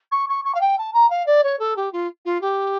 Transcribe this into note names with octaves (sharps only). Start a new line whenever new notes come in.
C#6
C#6
C#6
F5
G5
A5
A#5
F5
D5
C#5
A4
G4
F4
F4
G4